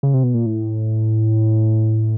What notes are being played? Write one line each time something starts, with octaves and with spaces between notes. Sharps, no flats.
C#3
C3
B2
A#2
A2